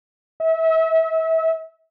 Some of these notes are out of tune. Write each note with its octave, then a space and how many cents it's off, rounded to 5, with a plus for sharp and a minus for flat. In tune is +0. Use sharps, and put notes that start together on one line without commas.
E5 -35